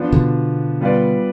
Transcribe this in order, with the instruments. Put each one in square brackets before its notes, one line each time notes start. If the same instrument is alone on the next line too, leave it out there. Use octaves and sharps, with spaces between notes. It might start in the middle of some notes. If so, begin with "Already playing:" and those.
Already playing: [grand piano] F3 B3 D4
[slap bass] B2 D3
[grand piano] G3 B3 F4 B4 D5